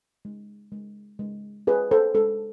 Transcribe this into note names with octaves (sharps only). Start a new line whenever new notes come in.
G#3
G#3
G#3
F4 G#4 B4
A4 C5
G#3 A4